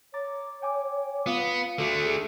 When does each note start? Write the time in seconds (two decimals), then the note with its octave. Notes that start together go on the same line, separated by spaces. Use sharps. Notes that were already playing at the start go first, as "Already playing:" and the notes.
0.14 C#5 A#5 D6 A6
0.62 G5 G#5 D6
1.26 B3 F4 F5 D#6
1.79 D3 A3 F#4 A4
2.04 G#4